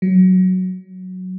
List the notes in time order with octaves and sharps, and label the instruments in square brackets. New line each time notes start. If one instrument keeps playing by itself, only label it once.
[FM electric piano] F#3